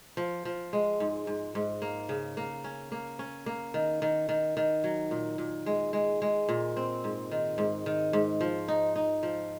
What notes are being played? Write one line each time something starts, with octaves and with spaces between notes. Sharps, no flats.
F3
F3
G#3
G#2
G#2
G#2
A#3
C#3
A#3
C#4
A#3
C#4
A#3
D#3
D#3
D#3
D#3
F#3
A#2
A#2
G#3
G#3
G#3
A#2
C4
G#2
D#3
G#2
D#3
G#2
F3
D#4
D#4
F3